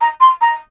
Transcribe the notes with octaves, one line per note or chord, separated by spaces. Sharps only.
A#5
C6
A#5